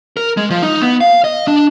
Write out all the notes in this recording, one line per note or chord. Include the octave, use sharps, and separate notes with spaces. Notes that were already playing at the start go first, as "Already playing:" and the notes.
A#4
G#3
F3
D#4
B3
F5
D#5
D4